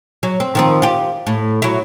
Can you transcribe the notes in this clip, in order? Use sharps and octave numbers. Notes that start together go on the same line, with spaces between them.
F#3
C4
D#3 F3 C4
F4 G4
A2
F#3 E4